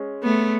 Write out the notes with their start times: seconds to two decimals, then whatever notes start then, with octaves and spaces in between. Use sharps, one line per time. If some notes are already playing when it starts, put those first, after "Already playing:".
Already playing: G#3 C#4
0.23 A3 B3